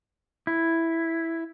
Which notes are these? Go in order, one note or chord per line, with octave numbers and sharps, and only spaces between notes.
E4